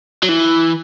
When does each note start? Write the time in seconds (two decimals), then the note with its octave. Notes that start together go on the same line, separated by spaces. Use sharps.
0.23 F#3
0.29 E3